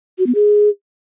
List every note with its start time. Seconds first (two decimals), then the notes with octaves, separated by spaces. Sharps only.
0.18 F#4
0.27 B3
0.35 G#4